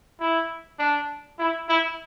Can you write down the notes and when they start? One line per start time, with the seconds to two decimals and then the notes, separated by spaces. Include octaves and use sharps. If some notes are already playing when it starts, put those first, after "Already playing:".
0.21 E4
0.79 D4
1.39 E4
1.68 E4